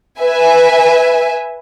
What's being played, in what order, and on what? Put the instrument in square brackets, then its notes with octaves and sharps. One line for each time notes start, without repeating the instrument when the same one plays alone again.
[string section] B4 E5 G#5